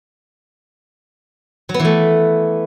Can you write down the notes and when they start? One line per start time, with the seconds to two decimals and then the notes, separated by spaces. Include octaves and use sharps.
1.69 F#3
1.74 B3
1.79 E3
1.85 A3